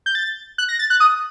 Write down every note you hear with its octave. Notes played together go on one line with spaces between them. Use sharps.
G6
A6
F#6
A#6
A6
F#6
D#6